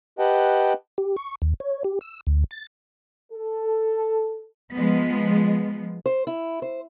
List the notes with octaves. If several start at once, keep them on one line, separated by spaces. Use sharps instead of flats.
G4 B4 D#5 F#5 G5 A5
G4
C#6
D#2
C#5
G4
E6
D2
A6
A4
F3 G#3 B3
C5
E4
C5